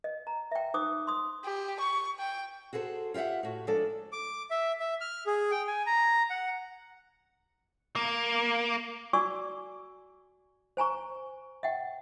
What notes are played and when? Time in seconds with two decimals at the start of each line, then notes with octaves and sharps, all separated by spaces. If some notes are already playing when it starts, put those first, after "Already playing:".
0.04 D#5
0.27 A#5
0.51 E5 G5
0.74 D#4 C5 D6 D#6
1.07 C6 D#6
1.44 G4
1.80 C#6
2.19 G5
2.73 F#4 G#4 A4 B4 C5
3.14 F4 G4 D#5 E5 F#5
3.43 A2 F#4
3.67 F3 G#3 D4 A4
4.13 D6
4.51 E5
4.80 E5
5.01 F6
5.26 G#4
5.51 G5
5.67 G#5
5.86 A#5
6.30 F#5
7.96 A#3
9.13 F#4 D5 G#5 C#6 D6 E6
10.77 C5 G#5 A#5 C#6
11.63 E5 F#5 G5